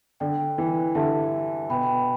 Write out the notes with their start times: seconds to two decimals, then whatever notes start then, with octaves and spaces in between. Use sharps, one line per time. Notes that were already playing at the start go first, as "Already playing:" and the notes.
0.20 D3 A4 D5 G5
0.58 E3
0.95 D3 G4 E5 A5
1.69 B2 B4 G5 B5